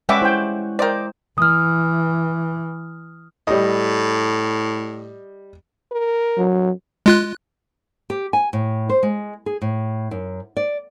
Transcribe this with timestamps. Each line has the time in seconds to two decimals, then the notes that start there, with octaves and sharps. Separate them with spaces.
0.09 G3 G#3 C#4 F#4 B4 E5 D6
0.22 E4 C5 G5
0.79 A#4 C5 D5 D#5 G5
1.38 E3 D#6 F6
3.47 A2 G3 D#5
5.92 A#4
6.37 F#3
7.06 G#3 F4 F#6
8.10 G4
8.33 G#5
8.53 A2
8.89 C5
9.03 G#3
9.46 G#4
9.62 A2
10.11 F#2
10.57 D5